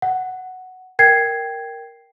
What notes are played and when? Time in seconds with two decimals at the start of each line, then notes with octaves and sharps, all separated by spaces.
0.02 F#5
0.99 A#4 G5 G#6 C7